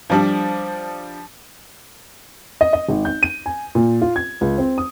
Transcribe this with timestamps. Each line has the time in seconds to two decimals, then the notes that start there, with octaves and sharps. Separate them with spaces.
0.10 F3 G3 D4
2.61 D#5
2.73 D#5
2.89 G#1
3.05 G6
3.23 D#7
3.46 G#5
3.75 A#2
4.02 F4
4.16 G#6
4.41 C#2
4.58 C4
4.78 D#6